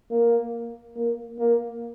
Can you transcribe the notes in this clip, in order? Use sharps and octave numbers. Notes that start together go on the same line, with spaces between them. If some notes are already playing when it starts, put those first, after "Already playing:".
A#3
A#3
A#3